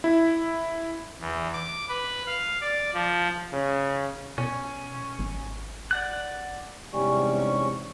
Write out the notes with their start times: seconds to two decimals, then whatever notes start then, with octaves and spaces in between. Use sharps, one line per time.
0.04 E4
1.20 E2
1.53 D6
1.88 B4
2.27 F5
2.61 D5
2.94 F3
3.53 C#3
4.38 B2 C#4
5.19 G#1
5.91 D5 F#5 F#6
6.93 E2 G#2 C3 G3 C#4 C#6